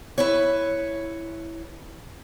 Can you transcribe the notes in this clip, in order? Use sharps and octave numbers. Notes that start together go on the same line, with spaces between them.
E4 B4 C#5